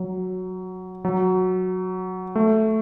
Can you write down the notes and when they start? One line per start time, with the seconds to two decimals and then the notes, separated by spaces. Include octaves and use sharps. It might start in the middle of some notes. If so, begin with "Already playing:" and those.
Already playing: F#3
1.05 F#3
2.36 A3